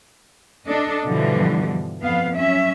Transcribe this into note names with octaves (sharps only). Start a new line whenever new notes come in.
D4 A4 D#5
G2 B2 D3 E3 F3 G3
F2 B3 F5
F#3 C#4 E5